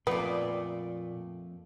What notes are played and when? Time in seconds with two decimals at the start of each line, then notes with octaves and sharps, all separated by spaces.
0.07 F2 A#2 A3 B3 B4 D5